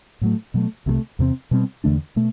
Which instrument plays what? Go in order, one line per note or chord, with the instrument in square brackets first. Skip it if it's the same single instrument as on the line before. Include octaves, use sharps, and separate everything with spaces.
[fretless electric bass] A2 F#3 A3
B2 F#3 A3
C2 C3 F#3 A3
E2 C3 G3 C4
B2 G3 C4
E2 D3 A3 D4
B2 A3